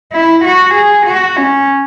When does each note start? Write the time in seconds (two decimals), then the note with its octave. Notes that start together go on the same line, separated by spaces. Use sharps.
0.13 E4
0.45 F#4
0.75 G#4
1.07 F#4
1.37 C#4